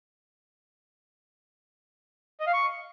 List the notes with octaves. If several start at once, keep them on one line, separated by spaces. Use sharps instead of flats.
D#5
F5
C#6